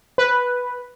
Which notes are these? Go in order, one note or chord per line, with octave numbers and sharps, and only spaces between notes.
B4